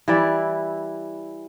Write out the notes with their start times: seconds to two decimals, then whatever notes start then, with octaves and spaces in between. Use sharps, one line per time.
0.08 E3 G3 E4 D5